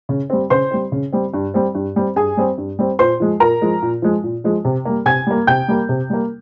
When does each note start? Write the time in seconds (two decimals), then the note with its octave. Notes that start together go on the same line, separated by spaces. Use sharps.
0.09 C#3
0.30 G3 C4
0.50 C#3 C5 C6
0.71 G3 C4
0.92 C#3
1.13 G3 C4
1.34 G2
1.54 G3 C4
1.75 G2
1.96 G3 C4
2.16 G2 G#4 G#5
2.37 G3 C4
2.58 G2
2.79 G3 C4
2.99 A#2 C5 C6
3.20 F3 G#3
3.40 A#2 A#4 A#5
3.62 F3 G#3
3.82 A#2
4.02 F3 G#3
4.24 A#2
4.44 F3 G#3
4.65 C3
4.85 G3 A#3
5.06 C3 G#5 G#6
5.27 G3 A#3
5.47 C3 G5 G6
5.68 G3 A#3
5.89 C3
6.10 G3 A#3